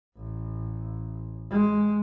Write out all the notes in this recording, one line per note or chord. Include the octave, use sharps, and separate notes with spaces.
A1
G#3